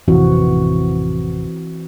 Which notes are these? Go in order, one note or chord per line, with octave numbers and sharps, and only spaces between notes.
A1 F2 C3 E3 C4 F#4